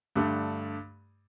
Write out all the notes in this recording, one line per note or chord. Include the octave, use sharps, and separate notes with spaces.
G2 D3 A3